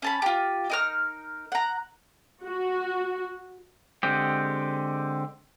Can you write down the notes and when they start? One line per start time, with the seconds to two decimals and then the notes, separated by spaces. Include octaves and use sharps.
0.02 C#4 A5 B5
0.22 F4 G4
0.70 D#4 A#4 F6
1.52 F#5 A#5
2.43 F#4
4.03 D3 G#3 C4 G4